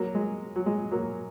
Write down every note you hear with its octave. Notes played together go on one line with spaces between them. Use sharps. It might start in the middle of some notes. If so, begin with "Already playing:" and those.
Already playing: F#3 A#3
G#3
F#3
G#3
F#3 A#3